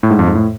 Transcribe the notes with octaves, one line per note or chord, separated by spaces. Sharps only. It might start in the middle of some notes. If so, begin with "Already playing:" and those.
A2
G#2
F2
G#2
A2